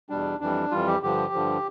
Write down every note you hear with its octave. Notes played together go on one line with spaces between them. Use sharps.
E2 B2 G3 D4
F2 E3 G3 D4
F2 E3 G3 F4
G4
G2 D3 F3 G4
G2 D3 F3